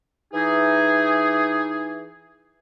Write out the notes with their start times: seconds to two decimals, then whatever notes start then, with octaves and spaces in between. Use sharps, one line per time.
0.33 E3 D#4 G#4